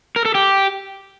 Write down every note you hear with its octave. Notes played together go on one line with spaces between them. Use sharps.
A#4
A4
G4